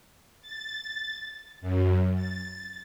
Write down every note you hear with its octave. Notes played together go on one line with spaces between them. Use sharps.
A6
F#2
A6